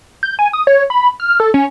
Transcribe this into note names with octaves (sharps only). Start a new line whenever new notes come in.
G6
G#5
D#6
C#5
B5
F6
A4
C#4